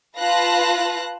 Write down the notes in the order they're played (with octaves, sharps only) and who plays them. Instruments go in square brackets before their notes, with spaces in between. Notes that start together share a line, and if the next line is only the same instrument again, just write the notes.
[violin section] F4 B4 F5 A5 F#6 A#6